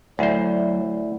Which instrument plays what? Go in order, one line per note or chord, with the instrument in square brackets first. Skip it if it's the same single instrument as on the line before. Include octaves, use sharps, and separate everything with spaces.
[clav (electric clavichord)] D2 C5 [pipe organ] F#3 [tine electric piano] A3 E4